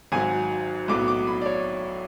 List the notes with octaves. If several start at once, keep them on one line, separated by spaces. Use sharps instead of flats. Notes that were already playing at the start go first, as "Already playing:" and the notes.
G#1 G#2 F#3 G#5
B1 A2 F#3 B3 D6
D6
B5
D5
C#5